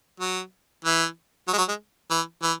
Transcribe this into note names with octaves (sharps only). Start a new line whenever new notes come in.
F#3
E3
F#3
G#3
F#3
G#3
E3
E3